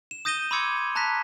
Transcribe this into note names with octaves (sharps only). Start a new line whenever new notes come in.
E7
D#6 G6 A#6 D#7 E7 G7
B5 C6 D6 E6 G#6 C#7
A5 A#5 F#6 A#6 B6